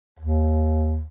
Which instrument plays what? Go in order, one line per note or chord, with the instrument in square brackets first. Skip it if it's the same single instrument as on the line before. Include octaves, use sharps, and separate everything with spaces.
[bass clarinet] D#2